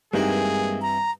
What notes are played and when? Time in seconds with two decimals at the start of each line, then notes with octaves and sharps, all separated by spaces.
0.13 G2 E3 G#3 A#3 C4 D#4 G#4
0.82 A#5